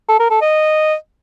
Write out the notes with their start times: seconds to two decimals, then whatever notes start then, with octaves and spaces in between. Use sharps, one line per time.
0.09 A4
0.19 A#4
0.30 A4
0.41 D#5